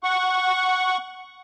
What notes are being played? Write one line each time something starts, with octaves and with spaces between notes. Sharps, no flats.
F#5 C#6